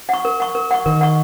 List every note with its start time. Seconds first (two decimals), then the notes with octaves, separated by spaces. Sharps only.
0.09 F#5 C#6
0.25 A#4
0.40 F#5 C#6
0.55 A#4
0.71 F#5 C#6
0.86 D#3 A#4
1.01 F#5 C#6